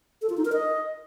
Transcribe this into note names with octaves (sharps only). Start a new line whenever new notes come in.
A4
F4
D#4
A#4
D#5